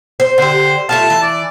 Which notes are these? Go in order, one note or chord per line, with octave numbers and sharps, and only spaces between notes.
C5
D3 G4 C5
A3 F4 F5 A5
E3
D5